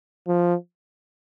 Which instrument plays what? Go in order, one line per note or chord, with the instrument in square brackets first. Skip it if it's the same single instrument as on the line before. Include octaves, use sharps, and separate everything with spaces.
[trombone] F3